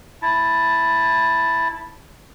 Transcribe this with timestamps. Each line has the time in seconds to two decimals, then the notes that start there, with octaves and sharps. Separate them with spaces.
0.22 E4 A5